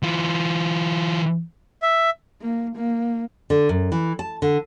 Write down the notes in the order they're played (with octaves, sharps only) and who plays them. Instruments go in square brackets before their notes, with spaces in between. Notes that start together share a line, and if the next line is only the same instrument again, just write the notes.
[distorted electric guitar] E3 F4
[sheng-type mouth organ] E5
[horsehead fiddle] A#3
A#3
[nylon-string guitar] D3
F#2
E3
A5
D3